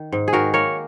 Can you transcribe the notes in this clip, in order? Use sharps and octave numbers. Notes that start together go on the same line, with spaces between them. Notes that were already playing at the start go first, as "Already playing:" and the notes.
Already playing: D#3
G#2
G#4
D#3 F#4 A#4
A#3 A#4 C#5